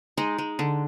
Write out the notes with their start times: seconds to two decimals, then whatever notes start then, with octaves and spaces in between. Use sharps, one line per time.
0.18 G#3 D#4
0.38 G#3
0.59 D3